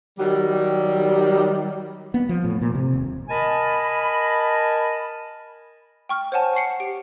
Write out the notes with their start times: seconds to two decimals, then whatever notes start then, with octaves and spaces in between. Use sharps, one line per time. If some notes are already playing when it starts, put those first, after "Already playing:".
0.19 D#3 F#3 G3
2.14 B3
2.29 F3
2.44 A2
2.62 A#2
2.75 C3
2.94 D#1
3.29 A#4 D#5 G#5 A5 B5
6.09 G5 C#6 F6
6.32 C5 C#5 F#5 G#5 A5
6.53 F#5 C#6 C7 C#7
6.80 G4 D7